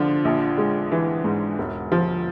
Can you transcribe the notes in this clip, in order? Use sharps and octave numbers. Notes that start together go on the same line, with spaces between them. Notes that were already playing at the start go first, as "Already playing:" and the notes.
Already playing: D3 F3
A#1
G#3
E3
G#2
E1
F3